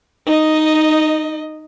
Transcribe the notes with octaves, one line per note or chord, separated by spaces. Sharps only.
D#4 D#5